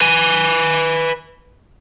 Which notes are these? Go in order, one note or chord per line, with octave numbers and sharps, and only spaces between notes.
B4 G#5